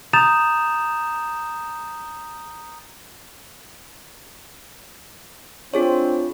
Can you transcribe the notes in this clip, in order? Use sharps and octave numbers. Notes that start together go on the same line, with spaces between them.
A#5 D#6 G6 A6 E7 F7
C4 D4 F4 G#4 C#5